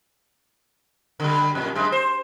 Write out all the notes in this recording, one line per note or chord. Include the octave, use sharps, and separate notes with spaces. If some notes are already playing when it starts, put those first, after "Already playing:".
D3 G3
F2 A#2
F#2 G#3
C5